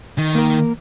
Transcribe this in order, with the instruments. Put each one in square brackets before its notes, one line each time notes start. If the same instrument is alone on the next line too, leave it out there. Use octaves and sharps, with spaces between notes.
[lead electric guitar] D#3
[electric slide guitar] A#3 A#4